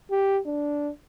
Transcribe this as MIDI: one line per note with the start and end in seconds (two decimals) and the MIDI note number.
0.11 0.39 67
0.46 0.90 62